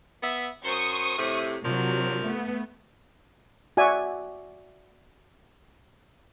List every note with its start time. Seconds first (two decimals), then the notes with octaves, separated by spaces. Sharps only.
0.21 B3 E5
0.65 F#2 C5 C#6 D#6
1.17 A2 C3
1.63 C3 F3 F#3 D4 A#4
2.23 A3 B3
3.77 F#4 D5 E5 G#5